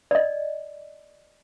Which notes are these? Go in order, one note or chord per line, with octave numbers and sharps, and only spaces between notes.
D5 D#5